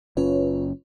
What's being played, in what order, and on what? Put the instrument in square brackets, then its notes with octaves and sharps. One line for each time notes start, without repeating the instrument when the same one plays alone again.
[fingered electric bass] F#1 C#4 [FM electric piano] F4 B4 C#5